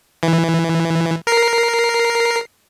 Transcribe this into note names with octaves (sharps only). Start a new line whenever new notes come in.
E3
A#4 C7